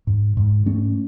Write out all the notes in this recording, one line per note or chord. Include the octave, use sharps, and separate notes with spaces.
G#2
G#2
G#2 A3 C#4